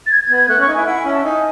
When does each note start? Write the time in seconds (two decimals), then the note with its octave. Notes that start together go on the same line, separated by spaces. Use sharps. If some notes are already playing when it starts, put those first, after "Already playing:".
0.06 A6
0.11 G#6
0.23 G#6
0.30 B3
0.36 G#6
0.49 A3 F#6
0.58 C#4 C#6
0.67 D#4
0.74 E4 G#5
0.86 E4 F#5
0.99 G#5
1.05 C#4
1.11 A5
1.24 D#4 G#5